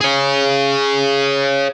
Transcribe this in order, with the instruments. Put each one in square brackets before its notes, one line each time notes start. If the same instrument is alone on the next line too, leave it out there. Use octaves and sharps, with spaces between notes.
[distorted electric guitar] G#4 C#5